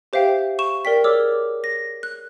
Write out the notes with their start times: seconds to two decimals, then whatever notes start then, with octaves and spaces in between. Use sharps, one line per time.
0.13 G4 C5 E5 F5 G5
0.59 C#6 E7
0.85 A#4 D5 G5 B6
1.04 G#4 C#5 D5 D6 E6 F6
1.64 A#6
2.03 F#6